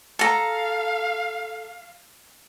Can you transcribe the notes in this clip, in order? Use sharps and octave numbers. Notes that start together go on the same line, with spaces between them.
A4 F5 A#5